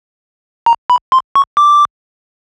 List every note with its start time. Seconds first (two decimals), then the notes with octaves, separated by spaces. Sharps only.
0.66 A#5
0.90 B5
1.12 C6
1.35 C#6
1.57 D6